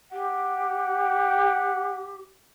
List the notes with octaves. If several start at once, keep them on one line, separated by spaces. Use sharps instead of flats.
G4 F#5